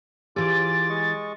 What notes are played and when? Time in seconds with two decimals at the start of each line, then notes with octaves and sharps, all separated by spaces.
0.36 E3 F4 G4 G#4 D6 A6 D7
0.89 G#3 D#5 C#6